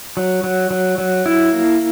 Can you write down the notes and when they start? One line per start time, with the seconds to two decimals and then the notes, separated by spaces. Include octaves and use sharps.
0.17 F#3
0.44 F#3
0.71 F#3
0.98 F#3
1.26 E4
1.53 A#3